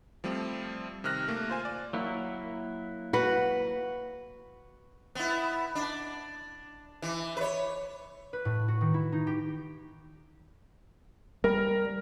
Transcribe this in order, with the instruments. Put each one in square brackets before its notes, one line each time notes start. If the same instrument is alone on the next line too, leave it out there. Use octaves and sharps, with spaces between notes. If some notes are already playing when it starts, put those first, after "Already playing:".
[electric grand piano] F3 G3 A3 C4
C3 D#3 F6 F#6 A#6
A3 A#3
F4 C5 G#5
D5
[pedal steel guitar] F#3 A#3 E4
[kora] F#4 B4
[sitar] B3 E4
D4
E3
B4 C#5
[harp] B4
A2
F#4
D#3
E4
D#4
G4
[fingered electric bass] G3 [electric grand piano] A#4